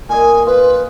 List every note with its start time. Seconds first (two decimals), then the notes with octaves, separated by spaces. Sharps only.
0.09 A#2 D#5 G#5
0.47 F4 B4 C5